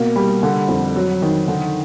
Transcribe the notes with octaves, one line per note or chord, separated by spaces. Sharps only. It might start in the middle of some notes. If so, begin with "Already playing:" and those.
Already playing: B2 A#3
G3
D3
F2
F#3
D#3
D3